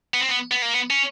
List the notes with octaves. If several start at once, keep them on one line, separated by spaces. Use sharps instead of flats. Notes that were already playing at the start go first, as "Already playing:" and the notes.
B3
C4
B3
B3
A#3
B3
C#4